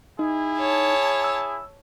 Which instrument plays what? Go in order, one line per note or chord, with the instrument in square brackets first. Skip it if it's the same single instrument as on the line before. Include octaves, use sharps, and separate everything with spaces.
[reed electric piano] D#4 [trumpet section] E4 G#4
[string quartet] C#5 A5
[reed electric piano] E6